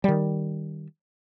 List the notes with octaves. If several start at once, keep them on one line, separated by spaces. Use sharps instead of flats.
D#3 G3